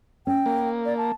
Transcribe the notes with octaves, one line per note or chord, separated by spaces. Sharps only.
C#4 G5
A#3
D5
A5